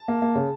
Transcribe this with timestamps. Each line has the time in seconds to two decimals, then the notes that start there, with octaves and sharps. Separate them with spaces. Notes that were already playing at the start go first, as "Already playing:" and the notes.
Already playing: A5
0.08 A#3
0.22 A#3
0.35 C#3